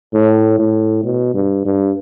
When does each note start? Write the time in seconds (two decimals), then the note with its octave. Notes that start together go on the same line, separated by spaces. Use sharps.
0.14 A2
0.59 A2
1.04 B2
1.34 G2
1.65 G2